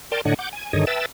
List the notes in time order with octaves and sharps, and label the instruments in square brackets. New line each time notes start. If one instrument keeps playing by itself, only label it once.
[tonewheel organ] A#4 D5 G5 A5 C6
A2 D3 D4 C#5 D#5 F#5
F#5 D6 G6
G#5
G2 D3 D#3 G#4 C#5 D#5
B4 E5 G5 A5 E6 A6